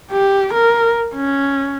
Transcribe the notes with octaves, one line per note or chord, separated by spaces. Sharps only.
G4
A#4
C#4